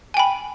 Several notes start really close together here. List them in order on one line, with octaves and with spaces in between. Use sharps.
G#5 G5 B5